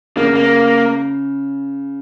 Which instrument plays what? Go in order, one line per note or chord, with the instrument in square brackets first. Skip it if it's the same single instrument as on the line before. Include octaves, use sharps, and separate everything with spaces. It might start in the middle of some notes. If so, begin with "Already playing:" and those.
[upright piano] C#3 [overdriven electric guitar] A#3
[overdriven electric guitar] A#3